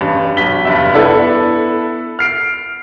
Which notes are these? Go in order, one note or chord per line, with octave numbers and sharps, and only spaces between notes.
A1 G2
B1 B6 G7
F1 G2 E5
B3 D4 E4 A4 D5
F6 C7 D7